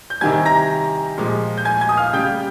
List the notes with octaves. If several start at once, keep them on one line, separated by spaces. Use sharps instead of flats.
G6
C3 D#3 G3 G#5 G#6
A#5 A#6
A#2 F3 G#3
G6
G#5 G#6
G#5 G#6
D#6
F5 F6
C#3 G3 G5 G6